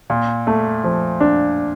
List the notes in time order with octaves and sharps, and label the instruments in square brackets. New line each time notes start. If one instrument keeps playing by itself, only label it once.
[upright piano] A#2
A3
F3
D4